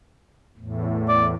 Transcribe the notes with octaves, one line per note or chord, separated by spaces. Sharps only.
E2 A2
D5